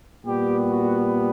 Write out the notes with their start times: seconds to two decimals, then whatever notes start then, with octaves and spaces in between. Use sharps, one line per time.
0.25 A#2 G3 B3 G4
0.68 F#4